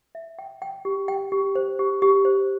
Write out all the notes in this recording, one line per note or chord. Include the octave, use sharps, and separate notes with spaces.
E5
G5
G5
G4
G5
G4
C5
G4
G4
C5